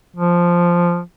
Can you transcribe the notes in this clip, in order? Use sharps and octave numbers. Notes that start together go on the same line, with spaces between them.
F3